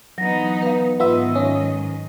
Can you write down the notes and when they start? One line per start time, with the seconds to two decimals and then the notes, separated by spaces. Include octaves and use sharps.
0.18 E3 F#3 B3 D#4 A#6
0.62 B4 F5
1.00 G#2 D#3 B3 F4 D#5 E5
1.35 C#4